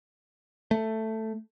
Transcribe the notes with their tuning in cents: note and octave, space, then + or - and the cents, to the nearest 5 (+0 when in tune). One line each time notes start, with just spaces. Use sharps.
A3 +5